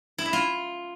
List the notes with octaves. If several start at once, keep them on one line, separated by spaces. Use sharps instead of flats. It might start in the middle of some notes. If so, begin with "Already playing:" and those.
E4
E5
F4